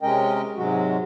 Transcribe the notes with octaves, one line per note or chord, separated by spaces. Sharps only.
C3 G#3 C#4 A#4 D#5 G5
G#2 C3 F#3 G#3 F#4